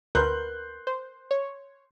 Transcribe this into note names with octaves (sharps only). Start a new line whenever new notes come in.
D2 A#4 B4 C6 F#6 G6
C5
C#5